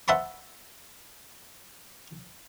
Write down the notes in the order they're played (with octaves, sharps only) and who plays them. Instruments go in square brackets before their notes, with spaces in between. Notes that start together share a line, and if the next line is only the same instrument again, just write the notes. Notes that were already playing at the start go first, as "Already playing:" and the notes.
[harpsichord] C5 E5 F#5 A5 B5 C#6